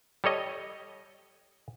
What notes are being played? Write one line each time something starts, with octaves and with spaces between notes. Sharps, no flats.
G3 A4 C#5 D#5